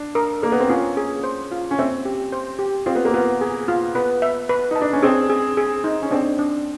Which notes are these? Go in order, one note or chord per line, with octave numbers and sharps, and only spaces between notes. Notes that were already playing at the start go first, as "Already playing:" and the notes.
Already playing: D4
A#4
A#3 A#4
B3
C4
C#4 F4
G#4
C5
F4
C#4
C4 E5
G4
C5
G4
C4 F4
B3
A#3
B3 F4
G#4
F4
B3 B4
E5
B4
D#4 A5
D4
C#4
C4 G#4
G#4
G#4
D#4
C#4
C4 D4
D4